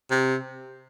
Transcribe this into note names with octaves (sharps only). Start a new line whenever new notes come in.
C3